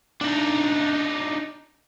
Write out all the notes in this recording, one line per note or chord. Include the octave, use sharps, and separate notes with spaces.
D4 D#4